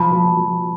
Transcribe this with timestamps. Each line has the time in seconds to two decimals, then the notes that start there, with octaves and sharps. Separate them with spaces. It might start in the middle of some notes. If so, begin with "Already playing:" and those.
Already playing: F3 A5 B5
0.11 F3
0.37 F3